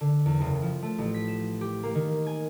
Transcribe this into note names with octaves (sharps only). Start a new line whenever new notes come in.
D3
E2
F#1
F3
A3
A1
B6
E7
G4
A#3
D#3
G#5